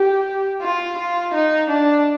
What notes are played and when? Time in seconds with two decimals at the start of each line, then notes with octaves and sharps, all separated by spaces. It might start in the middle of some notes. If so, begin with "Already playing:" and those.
Already playing: G4
0.62 F4
0.98 F4
1.34 D#4
1.70 D4